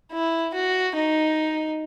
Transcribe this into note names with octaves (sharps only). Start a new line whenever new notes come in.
E4
F#4
D#4